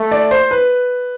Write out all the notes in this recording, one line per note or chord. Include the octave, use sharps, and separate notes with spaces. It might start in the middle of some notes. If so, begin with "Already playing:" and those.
Already playing: A3
D5
C5
B4